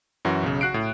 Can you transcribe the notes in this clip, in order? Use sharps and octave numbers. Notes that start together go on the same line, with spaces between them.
F#2 E3 F#4
B1 C#3
F#4 F#6 C7 D7
A2